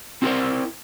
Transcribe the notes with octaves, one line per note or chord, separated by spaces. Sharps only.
C4 E4 F#4 A4 A#4 C5